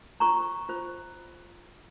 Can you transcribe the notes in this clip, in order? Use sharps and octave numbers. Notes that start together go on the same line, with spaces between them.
F4 C5 A#5 C#6
F4 C5